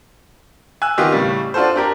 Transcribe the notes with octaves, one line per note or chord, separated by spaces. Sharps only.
G#5 E6 F#6
D#3 B3 F4 G4 D#5
A2 C#3 G3
D4 F4 F#4 A4 C5
D4 G4 A#4